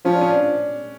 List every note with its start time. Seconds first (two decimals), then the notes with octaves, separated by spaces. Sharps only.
0.05 F3 C#4
0.14 D4
0.21 C#4
0.30 D4